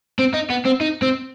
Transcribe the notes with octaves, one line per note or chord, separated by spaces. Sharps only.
C4
D#4
B3
C4
D#4
C4